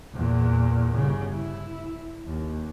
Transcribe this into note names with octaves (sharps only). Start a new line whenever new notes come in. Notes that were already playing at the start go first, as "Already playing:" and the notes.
E2 A#2
G1 C#3
E4
D#2